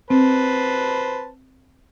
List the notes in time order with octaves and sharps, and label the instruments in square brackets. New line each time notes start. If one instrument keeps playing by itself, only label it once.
[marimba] C4 [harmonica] B4 C5 A5